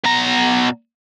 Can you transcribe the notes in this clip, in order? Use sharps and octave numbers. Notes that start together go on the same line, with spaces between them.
B2 A#5